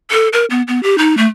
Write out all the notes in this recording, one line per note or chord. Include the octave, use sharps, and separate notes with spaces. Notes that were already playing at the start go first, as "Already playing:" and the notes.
A4
A#4
B3
B3
G4
D#4
A3